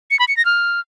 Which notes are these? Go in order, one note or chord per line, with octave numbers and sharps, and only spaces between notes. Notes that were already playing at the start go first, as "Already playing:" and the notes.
C#7
B5
C#7
A#6
F6